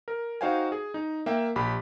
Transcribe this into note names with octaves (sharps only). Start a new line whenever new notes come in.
A#4
D#4 F#4 C5 F5 G5 G#5
G#4
D#4
A#3 E5 G5
A#1 G4 B5